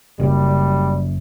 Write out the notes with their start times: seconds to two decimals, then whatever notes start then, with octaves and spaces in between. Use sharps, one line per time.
0.20 F#1 F#2 G3